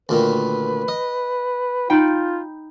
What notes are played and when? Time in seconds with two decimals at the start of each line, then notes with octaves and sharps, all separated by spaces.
0.09 D2 A#2 D#3 B4
0.88 D#5
1.90 D#4 F4 G5 B5